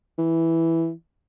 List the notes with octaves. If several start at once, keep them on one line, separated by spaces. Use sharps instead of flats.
E3